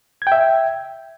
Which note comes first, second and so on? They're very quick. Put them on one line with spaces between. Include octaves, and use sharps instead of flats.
G#6 G5 E5